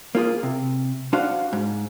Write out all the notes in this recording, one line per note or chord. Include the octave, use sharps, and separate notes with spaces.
A#3 F4 G#4
C3
D4 F#4 C5 F5 F#5
G#2